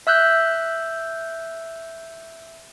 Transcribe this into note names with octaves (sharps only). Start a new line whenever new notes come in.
E5 E6 F#6 G6